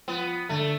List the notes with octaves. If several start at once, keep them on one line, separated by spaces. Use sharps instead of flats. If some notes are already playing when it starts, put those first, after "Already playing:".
F3 B3
D3 A3